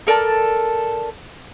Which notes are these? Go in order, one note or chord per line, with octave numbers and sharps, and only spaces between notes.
A4 A#4 D5 A5